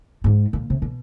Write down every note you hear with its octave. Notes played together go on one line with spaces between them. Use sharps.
G#2
A#2
C3
B2